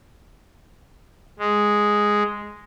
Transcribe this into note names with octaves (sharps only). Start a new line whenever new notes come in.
G#3